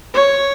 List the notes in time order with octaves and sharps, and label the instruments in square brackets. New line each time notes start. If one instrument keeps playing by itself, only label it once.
[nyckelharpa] C#5